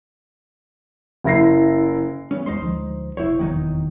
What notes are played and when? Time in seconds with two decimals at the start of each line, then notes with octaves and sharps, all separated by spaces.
1.24 F#1 E4 A#6 C7
2.31 E3 G3 B3 C#4
2.46 E2 G#3 D#4 C5 C6
2.62 D2 F3 G#3
3.17 F1 B1 E4 C5 C#5
3.39 F1 E2 D#3 F#3 D#4